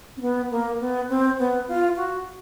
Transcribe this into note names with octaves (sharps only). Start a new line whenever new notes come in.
C4
B3
A#3
B3
C4
B3
F4
F#4